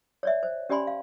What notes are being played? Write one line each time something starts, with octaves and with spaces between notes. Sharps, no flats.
C#5 D5 E5
C5
C#4 G4 D5 G#5 B5 C6
F5